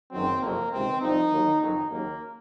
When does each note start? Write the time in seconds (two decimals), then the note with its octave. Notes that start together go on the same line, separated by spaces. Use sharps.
0.11 F#1 F#2 D#3 F#3 C4
0.41 F#1 F2 C3 F#3 A#3
0.71 C#2 C3 D#3 C4
1.01 C2 C3 F3 D#4
1.30 D#2 D#3 F#3
1.61 F#1 F2 D#3 F#3 D#4
1.91 D#2 C#3 F#3 A#3